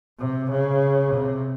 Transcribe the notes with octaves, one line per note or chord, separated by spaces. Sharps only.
C3
C#3
C3